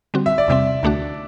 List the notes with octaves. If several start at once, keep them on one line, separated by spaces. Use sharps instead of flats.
D3 G3 C4 F#4
E5
D5
E2 C3 G3 C4 E5
D2 D3 A3 D4 F#4